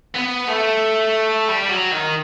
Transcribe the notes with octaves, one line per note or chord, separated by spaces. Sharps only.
B3
A3
G3
F#3
D#3